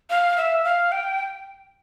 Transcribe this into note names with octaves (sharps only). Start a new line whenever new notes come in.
F5
E5
F5
G5